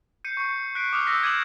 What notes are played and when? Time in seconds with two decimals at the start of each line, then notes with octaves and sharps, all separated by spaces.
0.24 G6 C7 C#7 D#7
0.37 C#6 C7 C#7
0.75 F#6 B6 C7 D7
0.93 D6 D#6 F6 F7
1.07 D6 E6 G6 A#6 B6
1.22 D6 G#6 D#7 E7 F#7